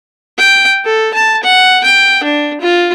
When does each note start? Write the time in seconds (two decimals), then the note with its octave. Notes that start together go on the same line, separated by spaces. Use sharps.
0.38 G5
0.85 A4
1.14 A5
1.43 F#5
1.84 G5
2.23 D4
2.61 F4